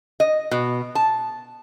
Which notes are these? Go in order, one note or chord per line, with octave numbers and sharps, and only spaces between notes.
D#5
B2
A5